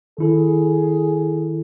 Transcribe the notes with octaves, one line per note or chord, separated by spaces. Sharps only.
D#3 E4 G#4 A4